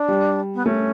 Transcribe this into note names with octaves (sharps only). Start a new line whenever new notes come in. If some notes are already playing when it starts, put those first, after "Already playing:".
Already playing: D4
G3
B3
A3 C#4